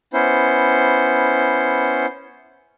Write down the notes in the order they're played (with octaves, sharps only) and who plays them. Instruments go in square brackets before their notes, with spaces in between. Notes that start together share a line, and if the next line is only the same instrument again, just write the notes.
[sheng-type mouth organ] B3 C#4 E4 C5